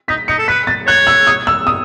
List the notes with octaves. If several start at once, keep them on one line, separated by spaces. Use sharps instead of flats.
D#4 B6
D#4 C#7
A4
B4 B6
A6
C#5 F#6
E6
D#6
E6
D#6